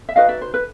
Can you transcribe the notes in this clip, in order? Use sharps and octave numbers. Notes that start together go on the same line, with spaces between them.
E5
D#4 F#4 B4 D#5 F5
D5 E5
C5
B4